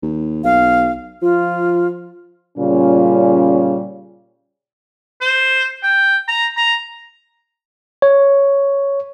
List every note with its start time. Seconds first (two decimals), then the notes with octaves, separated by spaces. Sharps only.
0.02 D#2
0.44 B1 F5
1.22 F3 F4
2.58 A#2 C#3 G3 C#4 F4
5.21 C5
5.83 G5
6.28 A#5
6.57 A#5
8.02 C#5